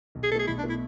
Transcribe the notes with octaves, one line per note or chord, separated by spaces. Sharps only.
B1
G#4
B2 A3 G#4 A4
B1 E4
D4
B2 A3
E4